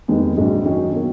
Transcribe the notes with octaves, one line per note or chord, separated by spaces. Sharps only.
F1 D#2 D#3 G#3 B3
A#1 G#2 F#3
F#2 D#3 F#3 C#4
B2 F#3 A#3